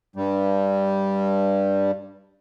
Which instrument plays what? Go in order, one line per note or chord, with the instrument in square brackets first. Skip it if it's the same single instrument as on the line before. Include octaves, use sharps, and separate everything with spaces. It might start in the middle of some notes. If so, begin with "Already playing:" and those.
[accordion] G2 G3